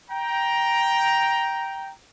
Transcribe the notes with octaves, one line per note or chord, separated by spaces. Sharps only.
G5 A#5